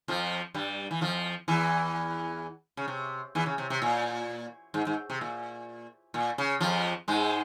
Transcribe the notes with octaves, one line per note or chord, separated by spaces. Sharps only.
F2 F3
G2 G3
E3
F2 F3
E2 E3
C#3
C3
E2 E3
C#3
C3
C3
A#2
G#2
G#2
C3
A#2
A#2
C#3
F2 F3
G#2 G#3